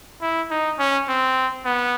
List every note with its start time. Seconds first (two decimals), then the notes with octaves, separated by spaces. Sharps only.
0.22 E4
0.51 D#4
0.79 C#4
1.08 C4
1.65 B3